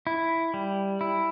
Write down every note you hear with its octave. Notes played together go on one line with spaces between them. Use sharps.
E4
G3
E4